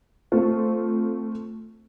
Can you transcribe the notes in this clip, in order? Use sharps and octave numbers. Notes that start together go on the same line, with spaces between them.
A3 C4 F4 C5